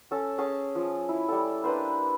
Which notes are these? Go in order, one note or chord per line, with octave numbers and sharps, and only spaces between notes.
C#4 A4
C#4 G#4 C#5 A5
F3
E4
G3 A4
A#3 D4 B4 C5